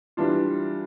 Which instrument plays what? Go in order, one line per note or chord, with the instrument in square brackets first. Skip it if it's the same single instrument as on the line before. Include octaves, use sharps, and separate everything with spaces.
[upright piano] E3 G3 D4 F4